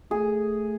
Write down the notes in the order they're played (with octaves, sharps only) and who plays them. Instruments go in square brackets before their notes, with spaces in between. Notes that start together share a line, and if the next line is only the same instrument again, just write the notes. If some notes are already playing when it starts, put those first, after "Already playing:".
[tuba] A3 [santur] G#4